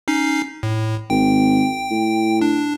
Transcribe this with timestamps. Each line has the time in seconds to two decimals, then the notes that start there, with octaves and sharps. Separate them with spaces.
0.08 C#4 D#4 C7
0.63 A2
1.10 G#1 G5
1.91 A2
2.41 D4